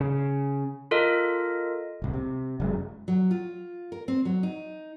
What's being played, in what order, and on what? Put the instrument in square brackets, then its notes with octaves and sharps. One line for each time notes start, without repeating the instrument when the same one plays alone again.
[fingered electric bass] C#3
[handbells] F4 A4 A#4 D#5
[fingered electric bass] D1 C2
C3
F1 F#2 G#3
[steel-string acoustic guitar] F#3
F4
A#4
C4
F#3
D#4